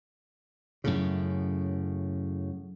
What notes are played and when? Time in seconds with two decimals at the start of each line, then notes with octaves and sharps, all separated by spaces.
0.84 F#2 A2 C#3